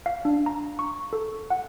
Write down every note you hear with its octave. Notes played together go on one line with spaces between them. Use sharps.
F5
D4
A#5
C#6
A4
F#5